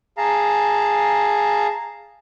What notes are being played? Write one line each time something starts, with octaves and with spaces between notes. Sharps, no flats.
G#4 F5 A5 A#5